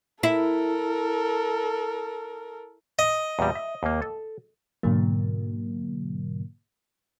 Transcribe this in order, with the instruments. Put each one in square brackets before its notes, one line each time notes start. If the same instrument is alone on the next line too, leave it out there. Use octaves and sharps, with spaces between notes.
[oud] E4 [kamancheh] A4 A#4
[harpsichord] D#5
[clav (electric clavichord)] E2 A#2 G3
E5
D#2 A#3
A4
[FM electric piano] G#2 B2 D3 F#3 A#3